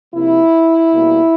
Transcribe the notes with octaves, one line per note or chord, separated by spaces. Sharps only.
C3 F3 A#3 E4
B2 G3 A#3